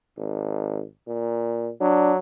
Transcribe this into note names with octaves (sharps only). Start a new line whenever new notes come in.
G#1
A#2
F#3 D4